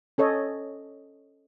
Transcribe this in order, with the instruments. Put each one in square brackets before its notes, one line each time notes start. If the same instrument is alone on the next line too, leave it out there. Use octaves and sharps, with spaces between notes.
[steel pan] C#4 A4 C#5 D#5